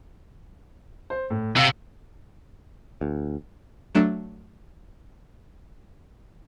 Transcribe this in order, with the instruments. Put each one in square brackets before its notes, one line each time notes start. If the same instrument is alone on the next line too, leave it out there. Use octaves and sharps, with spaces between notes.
[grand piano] C5
A2
[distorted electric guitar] C3 [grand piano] F5 E6
[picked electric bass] D2
[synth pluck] F#3 A3 D4